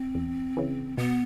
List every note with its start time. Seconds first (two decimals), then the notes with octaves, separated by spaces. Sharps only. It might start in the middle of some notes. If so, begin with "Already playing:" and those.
Already playing: C4
0.15 E2
0.57 C#3 E3
0.97 B2 B3